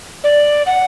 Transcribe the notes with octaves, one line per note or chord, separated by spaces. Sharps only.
D5
F#5